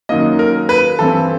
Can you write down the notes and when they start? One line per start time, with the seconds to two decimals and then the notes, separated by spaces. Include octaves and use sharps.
0.09 F#2 D#3 F#3 A#3 D#5
0.39 A#4
0.69 B4
0.99 G2 E3 A3 C4 A4